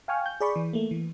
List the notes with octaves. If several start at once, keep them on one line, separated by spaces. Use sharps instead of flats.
F5 G5 G#5 C#6 F6
G6
G#4 D5 B5 C#6
E3
A3 A#3
E3